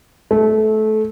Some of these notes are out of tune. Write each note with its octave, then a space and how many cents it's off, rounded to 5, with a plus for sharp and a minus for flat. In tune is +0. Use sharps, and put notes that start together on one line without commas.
A3 -20